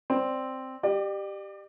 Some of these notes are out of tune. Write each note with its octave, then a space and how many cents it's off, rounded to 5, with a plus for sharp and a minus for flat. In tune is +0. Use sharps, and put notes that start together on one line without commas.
C4 +0 D5 +0
G4 +0 D5 +35